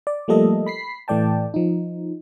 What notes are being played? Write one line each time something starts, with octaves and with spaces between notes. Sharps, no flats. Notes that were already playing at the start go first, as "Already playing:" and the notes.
D5
F3 G3 A3 A#3 A4 D#5
B5 B6 C7
A2 E3 A3 D5 G5 A5
F3 D#4